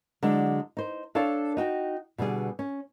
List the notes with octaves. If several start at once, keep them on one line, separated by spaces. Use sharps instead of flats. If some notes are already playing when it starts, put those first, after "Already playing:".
D3 F#3 G#3 D4
D#4 C5
D4 A4 C#5 D5 F5 A5
D#4 F#4 G5
B2 D3 G3 G#4
C#4